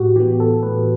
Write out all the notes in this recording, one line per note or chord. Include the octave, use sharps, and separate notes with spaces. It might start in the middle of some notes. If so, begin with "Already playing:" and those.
Already playing: A2 F#4 G4
E3 B3 G4
A4
A2 B4